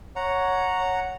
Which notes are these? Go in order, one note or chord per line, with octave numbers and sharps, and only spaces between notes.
C#5 F#5 A#5